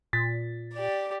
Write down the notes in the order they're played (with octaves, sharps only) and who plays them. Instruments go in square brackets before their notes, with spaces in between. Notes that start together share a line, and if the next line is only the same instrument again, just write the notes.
[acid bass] A#2 [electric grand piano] A6 B6
[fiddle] G4 D5